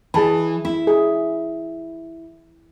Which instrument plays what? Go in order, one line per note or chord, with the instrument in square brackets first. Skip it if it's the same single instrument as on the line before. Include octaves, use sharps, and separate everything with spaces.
[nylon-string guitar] E3 [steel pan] G#4 A5 B5
[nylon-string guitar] E4
[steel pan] G#4